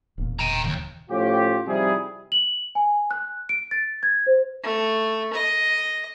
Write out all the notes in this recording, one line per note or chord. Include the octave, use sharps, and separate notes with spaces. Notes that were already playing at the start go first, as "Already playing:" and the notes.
E1 A#2
G5 A#5
D#2 C#3
A2 F3 C#4 F4 G4
C3 F3 G3 D#4 E4 G#4
F#7
G#5
F#6
D7
A6
G#6
C5
A3
D#5